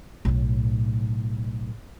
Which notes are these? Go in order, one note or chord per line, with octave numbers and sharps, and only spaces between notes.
B1 A2